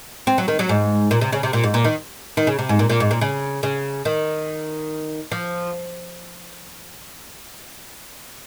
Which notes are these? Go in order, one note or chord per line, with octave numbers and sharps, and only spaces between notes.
C4
F#3
D#3
F#3
G#2
A#2
C3
C#3
C3
A#2
G#2
A#2
D#3
D#3
C#3
C3
G#2
A#2
A#2
G#2
A#2
C#3
C#3
D#3
F3